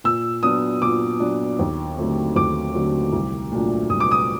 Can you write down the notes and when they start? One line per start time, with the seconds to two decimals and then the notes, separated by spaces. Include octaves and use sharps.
0.04 A#2 E6
0.43 F#3 B3 D4 D#6
0.82 A#2 D6
1.20 F#3 B3 D4
1.59 D#2
1.97 D3 F#3 A3 C4
2.36 D#2 D6
2.74 D3 F#3 A3 C4
3.12 C2
3.52 A#2 F#3 A3 D4
3.90 C2 D#6
4.00 D6
4.11 D#6